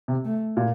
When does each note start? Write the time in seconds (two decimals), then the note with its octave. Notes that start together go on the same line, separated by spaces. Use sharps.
0.08 C3
0.25 A3
0.57 A#2